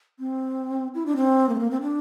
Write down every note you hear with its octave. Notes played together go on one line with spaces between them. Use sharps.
C4
E4
D4
C4
A#3
A3
A#3
C4
D4